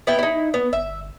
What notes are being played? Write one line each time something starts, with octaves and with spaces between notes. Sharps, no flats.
B3 E4 G5
D#4 E4
B3
G1 E5